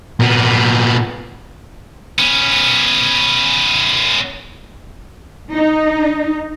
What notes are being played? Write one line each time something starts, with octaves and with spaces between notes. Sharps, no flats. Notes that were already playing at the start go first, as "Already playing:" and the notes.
A#2 B3
B3 C#4
D#4